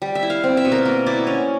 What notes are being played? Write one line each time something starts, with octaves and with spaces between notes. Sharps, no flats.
G3
E5
E4
F5
C4
E5
B2
A#4
A#3
E4 D5
C#4